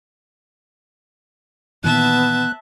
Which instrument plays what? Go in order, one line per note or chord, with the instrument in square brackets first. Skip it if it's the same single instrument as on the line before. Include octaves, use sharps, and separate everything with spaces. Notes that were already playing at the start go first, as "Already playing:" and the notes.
[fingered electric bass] A#2 D#3 E3 [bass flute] B3 [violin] E5 A5 [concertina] F#6